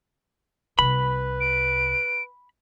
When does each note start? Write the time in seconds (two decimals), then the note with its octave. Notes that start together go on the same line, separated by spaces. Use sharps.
0.79 C2 C3 B4 B5
1.41 D7